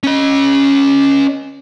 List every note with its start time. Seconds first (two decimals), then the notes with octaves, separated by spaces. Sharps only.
0.04 C#4 D#5